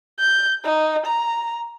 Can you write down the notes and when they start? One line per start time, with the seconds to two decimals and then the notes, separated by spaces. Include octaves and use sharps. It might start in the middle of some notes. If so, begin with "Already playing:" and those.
0.19 G6
0.65 D#4
1.06 A#5